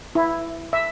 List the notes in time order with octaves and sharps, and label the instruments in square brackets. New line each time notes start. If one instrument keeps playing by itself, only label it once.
[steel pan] E4
E5